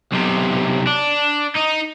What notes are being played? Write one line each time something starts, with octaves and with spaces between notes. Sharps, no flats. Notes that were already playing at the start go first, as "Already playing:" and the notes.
B1 C3
D4
D#4